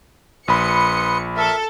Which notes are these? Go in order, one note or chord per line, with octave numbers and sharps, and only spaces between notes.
A#1 B4 B5 C6 D#6 C#7
A4 A#4 E5